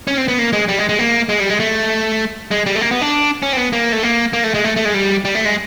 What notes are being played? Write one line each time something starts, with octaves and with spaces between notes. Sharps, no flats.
C#4
C4
B3
A#3
G#3
G3
G#3
G#3
A#3
G#3
G3
G#3
A3
G#3
G3
A3
A#3
B3
D4
C#4
C4
B3
A#3
A3
A#3
A#3
A3
G#3
A3
A3
G#3
G3
G3
A3
G#3